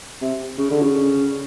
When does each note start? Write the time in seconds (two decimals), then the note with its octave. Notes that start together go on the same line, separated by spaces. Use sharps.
0.22 C3
0.58 C#3
0.71 D3
0.82 C#3